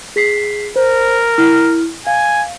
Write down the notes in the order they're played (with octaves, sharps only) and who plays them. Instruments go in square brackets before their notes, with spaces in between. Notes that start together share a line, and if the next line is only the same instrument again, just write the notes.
[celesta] G#4 B6 C7
[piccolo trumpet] A#4 [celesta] C5
[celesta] E4 F6
[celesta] F5 [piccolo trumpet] G#5